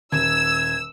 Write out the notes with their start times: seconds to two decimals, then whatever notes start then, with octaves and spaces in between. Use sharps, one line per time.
0.12 D#1 E6 G#6